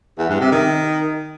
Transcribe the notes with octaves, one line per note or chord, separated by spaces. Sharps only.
E2
G2
C3
D#3